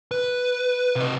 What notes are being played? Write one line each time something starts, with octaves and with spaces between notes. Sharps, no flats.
B4
C3 D#5